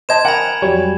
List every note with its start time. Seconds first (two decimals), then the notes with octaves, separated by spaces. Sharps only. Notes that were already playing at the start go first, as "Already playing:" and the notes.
0.09 C5 D#5 A5 G#6 E7
0.25 A#4 F#5 G#5 B5
0.62 F2 F#3 G3 C#5